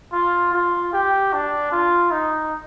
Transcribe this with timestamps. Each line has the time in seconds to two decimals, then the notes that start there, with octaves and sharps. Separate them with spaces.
0.12 F4
0.53 F4
0.93 G4
1.33 D4
1.72 F4
2.11 D#4